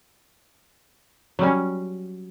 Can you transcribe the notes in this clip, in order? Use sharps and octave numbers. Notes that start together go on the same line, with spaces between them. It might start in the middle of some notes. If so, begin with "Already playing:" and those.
F#3 G3 C#4